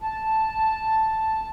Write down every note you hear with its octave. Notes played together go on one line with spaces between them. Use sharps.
A5